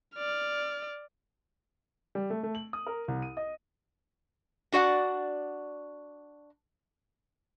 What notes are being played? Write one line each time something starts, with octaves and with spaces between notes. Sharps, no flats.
D5 F6
G3
A3
A3
F#7
D#6
A#4
C2
D#7
D#5
D4 F#4 D5 F#5